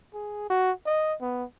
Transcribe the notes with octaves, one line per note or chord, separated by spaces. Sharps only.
G#4
F#4
D#5
B3